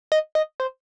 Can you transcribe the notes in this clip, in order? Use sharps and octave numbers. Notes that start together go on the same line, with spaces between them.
D#5
D#5
C5